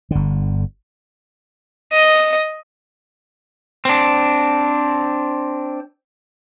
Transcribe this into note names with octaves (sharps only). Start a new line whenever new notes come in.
G1 D3
D#5
C4 D4